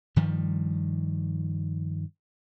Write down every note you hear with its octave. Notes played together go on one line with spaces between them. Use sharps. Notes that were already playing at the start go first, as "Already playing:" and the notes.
G2 D#3 F3 G3